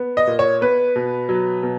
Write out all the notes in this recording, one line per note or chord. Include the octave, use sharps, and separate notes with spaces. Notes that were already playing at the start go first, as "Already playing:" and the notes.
Already playing: B3
D#5
A#2
C#5
B3 B4
B2
F#3
B2